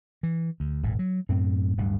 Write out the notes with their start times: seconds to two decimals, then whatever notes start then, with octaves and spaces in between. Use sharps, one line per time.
0.23 E3
0.60 D2
0.83 D#1 G#1 A2
0.99 F#3
1.29 F#2 A2 C4
1.77 D1 D2 G2 G3